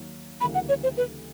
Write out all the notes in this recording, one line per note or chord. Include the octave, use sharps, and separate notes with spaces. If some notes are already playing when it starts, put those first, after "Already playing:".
Already playing: D#2 D#3 F#3 A#3
D2 C#3 E3 G3 A#3 B5
F#5
C#5
C5
B4